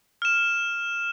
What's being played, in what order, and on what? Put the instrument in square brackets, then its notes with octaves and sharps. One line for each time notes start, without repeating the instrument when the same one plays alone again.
[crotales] F6 E7